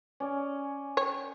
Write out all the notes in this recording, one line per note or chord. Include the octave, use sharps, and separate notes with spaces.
C#4 D5 G#5
C#5 G5